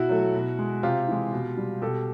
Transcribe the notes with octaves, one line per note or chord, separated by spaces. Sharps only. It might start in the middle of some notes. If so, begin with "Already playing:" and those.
Already playing: B2 E4 F#4
F#3 A3
B2
G#3
C3 F4 G4
E3 G#3
B2
G3
B2 G4 A4